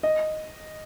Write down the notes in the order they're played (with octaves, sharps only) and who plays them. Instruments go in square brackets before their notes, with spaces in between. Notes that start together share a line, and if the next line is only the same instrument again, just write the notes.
[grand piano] D#5